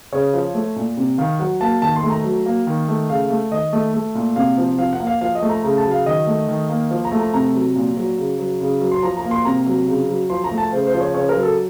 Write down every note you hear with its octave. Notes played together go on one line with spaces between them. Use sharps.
C#3 C#5
F3
A3
A#2
C3
D#3 F5
F#3 F#5
A#3 A5
D#3 A5
C6
A3
A#5
F#3
A#3
D#3
A3
C#3 F5
A3
D#3 D#5
A3
A3
A#2
C3 F5
F3
F3 F5
F#5
A#3
F5
F3 F5
D#5
A3
A#5
C#3 A#5
A5
F#3
F5
D#3 D#5
A3
D#3
A#3
F3
A#5
A3
A#5
C3 A#5
F#3
A#2
F#3
C#3
F#3
C#3
F#3
C6
F3 A#5
A#5
A#3
C6
C3 A#5
F#3
C#3
F#3
F3 C6
A#5
A3
A5
C#3 C5
C5
F3
C#5
C#3 C#5
A#4
F#3
A4